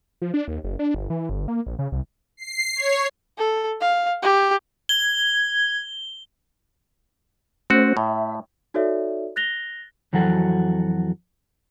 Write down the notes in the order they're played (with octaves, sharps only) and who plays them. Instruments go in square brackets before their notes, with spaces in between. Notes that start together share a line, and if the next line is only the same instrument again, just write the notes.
[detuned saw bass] F3
D4
D#2
F#1
D4
G1
E3
G1
A#3
A#1
C#3
C2
[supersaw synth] C7
C#5
[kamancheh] A4
F5
G4
[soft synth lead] G#6 [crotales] G7
[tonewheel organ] A3 C#4 C5 [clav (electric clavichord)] C4 F#4
[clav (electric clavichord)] A2 [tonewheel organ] E5
[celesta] D#4 F#4 A4 C#5 D5 E5
F#6 A6 A#6 F7 G7
[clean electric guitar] F2 E3 F#3 F#4 A4